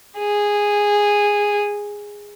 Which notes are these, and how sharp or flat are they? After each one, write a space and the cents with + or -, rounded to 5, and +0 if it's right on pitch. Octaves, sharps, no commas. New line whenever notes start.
G#4 -10